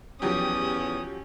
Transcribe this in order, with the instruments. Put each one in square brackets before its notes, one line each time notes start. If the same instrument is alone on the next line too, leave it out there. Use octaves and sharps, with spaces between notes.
[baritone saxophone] E2 [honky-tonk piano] F3 F#3 G4 [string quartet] C#4 [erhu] D#6